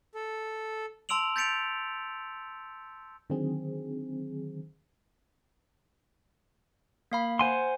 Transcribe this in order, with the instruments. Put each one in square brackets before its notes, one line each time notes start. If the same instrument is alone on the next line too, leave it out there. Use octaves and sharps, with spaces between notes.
[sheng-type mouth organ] A4
[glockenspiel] A5 C6 E6 D7 F7 F#7
G6 A6 B6 C#7 D7 F7
[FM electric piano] D3 D#3 F#3 C4 G#4
[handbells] A#3 F5 B5
[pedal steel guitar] C5 G#5 C6 [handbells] F#5